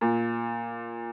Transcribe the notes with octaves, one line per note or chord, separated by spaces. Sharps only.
A#2